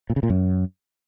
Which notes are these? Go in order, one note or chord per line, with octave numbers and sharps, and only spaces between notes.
A#2
C#3
A#2
F#2